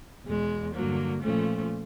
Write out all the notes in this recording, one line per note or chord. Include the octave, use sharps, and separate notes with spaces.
E2 B2 G#3
G2 D3 F#3 A#3
A#2 F3 A3 C#4